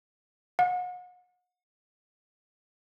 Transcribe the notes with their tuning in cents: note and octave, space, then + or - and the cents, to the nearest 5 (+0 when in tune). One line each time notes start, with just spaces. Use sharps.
F#5 -40